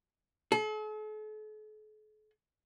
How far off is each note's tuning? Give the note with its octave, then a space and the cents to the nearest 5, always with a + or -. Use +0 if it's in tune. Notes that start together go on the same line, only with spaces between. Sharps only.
A4 -45